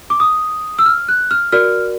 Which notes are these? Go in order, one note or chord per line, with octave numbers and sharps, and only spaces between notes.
D6
D#6
E6
F6
F#6
F6
F#4 A#4 D5 F6